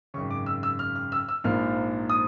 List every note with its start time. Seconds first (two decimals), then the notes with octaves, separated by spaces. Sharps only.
0.14 G#1 F#2 C#3 C#6
0.30 D6
0.46 E6
0.63 E6
0.79 F6
0.95 F6
1.12 E6
1.28 E6
1.44 A#1 G#2 F3 A#3 F6
2.10 D#6